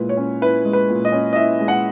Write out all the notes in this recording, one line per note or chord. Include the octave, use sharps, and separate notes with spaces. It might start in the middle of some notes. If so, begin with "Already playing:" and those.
Already playing: A#2 G#3 E4 B4
C#5
C#4
E4 B4
G#3
B4
A#2
D#5
C#4
D#5
E4 E5
G#3
F#5